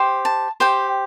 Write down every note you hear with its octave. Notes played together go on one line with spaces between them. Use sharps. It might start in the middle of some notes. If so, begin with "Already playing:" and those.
Already playing: G4 C5
A5
G4 C5 G5